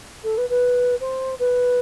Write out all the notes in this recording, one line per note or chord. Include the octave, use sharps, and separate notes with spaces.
A4
B4
B4
C5
B4